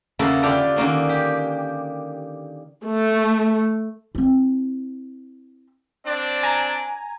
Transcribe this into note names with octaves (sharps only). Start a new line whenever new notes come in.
E2 C#3 A#3 E4 A4 B4
D3 F4 G4 A4 D5
D3 D#3 A#3 C#4
G4
A3
C4 E4
C4 D4 D5
G#5 A#5